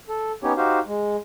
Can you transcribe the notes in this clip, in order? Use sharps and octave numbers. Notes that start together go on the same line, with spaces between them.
A4
B3 C#4 D#4 G4 C#5
D#4 F#4 G4 C5 F5
G#3